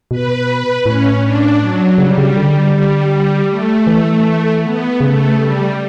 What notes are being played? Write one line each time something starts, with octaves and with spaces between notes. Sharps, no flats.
B2 B4
A2 C#4
D4
F#3
C#3 G3
C#3
D3
G3
A3
E3
B3
C#3 A3
G3